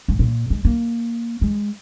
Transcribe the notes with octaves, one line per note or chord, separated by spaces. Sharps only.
G#2
A#2
G#3
A#3
G#3